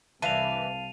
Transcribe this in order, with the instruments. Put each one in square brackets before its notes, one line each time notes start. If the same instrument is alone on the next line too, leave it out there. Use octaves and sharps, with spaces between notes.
[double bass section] C2 [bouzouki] E3 D4 B4 [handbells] F5 A5 [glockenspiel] D#7 F7